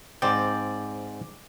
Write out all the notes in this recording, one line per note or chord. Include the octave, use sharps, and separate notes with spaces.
G#2 C4 D5 G5